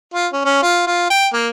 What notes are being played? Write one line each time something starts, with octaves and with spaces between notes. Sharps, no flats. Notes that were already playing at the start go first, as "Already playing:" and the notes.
F4
C#4
C#4
F4
F4
G5
A#3